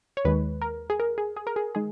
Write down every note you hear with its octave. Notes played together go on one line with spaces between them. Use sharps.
C#5
D#2 D#3 G#3 B4
A#4
G#4
A#4
G#4
G#4
A#4
G#4
D#3 G#3 G#4